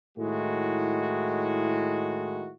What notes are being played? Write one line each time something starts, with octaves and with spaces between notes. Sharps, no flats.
A2 D#3 G#3 E4 F#4